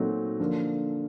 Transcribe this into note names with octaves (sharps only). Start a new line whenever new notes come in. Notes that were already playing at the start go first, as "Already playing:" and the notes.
Already playing: A#2 F#3 A3 C4 D#4
D3 F3 A#3 D4